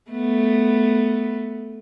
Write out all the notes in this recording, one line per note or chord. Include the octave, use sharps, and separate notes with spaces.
A3 B3